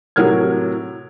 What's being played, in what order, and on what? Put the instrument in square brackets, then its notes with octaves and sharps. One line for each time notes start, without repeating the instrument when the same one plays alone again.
[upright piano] A2 C3 F#3 A#4 F6 G#6